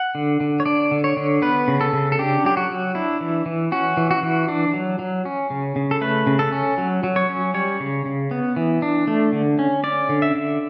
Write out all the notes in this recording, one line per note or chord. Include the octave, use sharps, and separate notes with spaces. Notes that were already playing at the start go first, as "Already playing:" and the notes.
Already playing: F#5
D3
D3
C#5
D4 D5
D3
C#5
D3
B3 B4
C#3
A4
C#3
A4
D4 G4
F#3 G4
F#4
F#3
D4 E4
E3
E3
C#4 F#4
E3
F#4
E3
D4
F#3
F#3
C#4
C#3
C#3
A4
A3 B4
C#3
A4
C#4
F#3
F#3
C#5
C#4
G3 C#5
C#3
C#3
B3
E3
D4
A3
D3
C#4
C#4 D5
D3
E5
D3